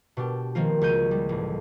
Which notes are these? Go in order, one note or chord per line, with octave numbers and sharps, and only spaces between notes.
B2 D4 G4
D#3 F3 A#3 C4 F4
C#2 F#4 G6 D#7
G3
A1